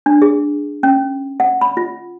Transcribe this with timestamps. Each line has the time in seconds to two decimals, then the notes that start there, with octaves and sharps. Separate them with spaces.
0.06 D4
0.22 G#4
0.83 C#4
1.40 F#5
1.61 B5
1.77 F4